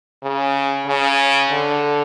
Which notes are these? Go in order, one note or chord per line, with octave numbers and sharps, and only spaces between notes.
C#3
C#3
D3